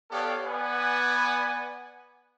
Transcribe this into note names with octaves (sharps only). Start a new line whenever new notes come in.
B3 G4 A4 C#5 D5 F5
B3 B4 D5 F#5 G#5